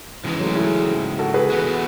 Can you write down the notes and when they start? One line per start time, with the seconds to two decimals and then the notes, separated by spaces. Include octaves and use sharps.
0.24 C#3 E3 G#3 D#4
0.40 F#3 A3
0.55 E4 G#4
1.18 F#4 A4
1.34 G#4 B4
1.50 E3 B3 F#4